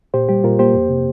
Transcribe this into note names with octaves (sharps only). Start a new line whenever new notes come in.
A#2 G4 C5
G3 G4
A#2 F4 A#4
A#3 G4 C5
F2
C3